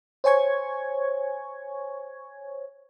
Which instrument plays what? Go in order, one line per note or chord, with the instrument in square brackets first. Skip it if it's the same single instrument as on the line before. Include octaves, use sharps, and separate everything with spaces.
[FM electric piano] C5 C#5 G#5 C#6 G#6